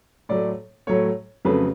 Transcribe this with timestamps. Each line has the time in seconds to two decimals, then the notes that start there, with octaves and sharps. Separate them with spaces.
0.29 A2 F#3 A3 D5
0.87 A2 F#3 A3 C#5
1.45 F2 C#3 F#3 A3 B4